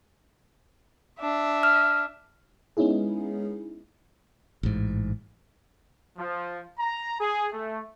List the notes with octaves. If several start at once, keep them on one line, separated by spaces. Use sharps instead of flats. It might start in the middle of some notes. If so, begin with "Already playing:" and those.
D4 E5
F6
G#3 B3 C#4 D#4 E4 G#4
A1 G#2
F3
A#5
G#4
A3